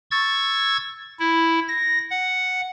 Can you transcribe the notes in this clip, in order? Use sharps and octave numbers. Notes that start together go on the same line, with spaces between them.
C#6 E6 G#6 A6
E4
A#6
F#5